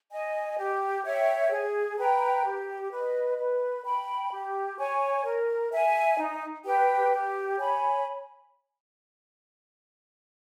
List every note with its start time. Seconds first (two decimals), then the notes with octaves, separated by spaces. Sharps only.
0.11 D#5 G#5
0.58 G4
1.05 C#5 E5 G5
1.51 G#4
1.98 B4 G5 A#5
2.44 G4
2.92 B4 D#5
3.37 B4
3.84 G5 B5
4.31 G4
4.78 C#5 G#5 C#6
5.25 A#4
5.72 E5 G#5
6.18 D#4
6.65 G4 B4 G5
7.12 G4
7.58 C#5 G#5 B5